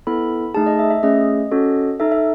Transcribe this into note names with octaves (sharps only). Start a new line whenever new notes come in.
B3 E4 A4 B5
A3 D#4 G#4 A5
D#5
E5
E5
A3 C#4 G#4 D#5
C#4 F#4 A4
D#4 A4 E5
E5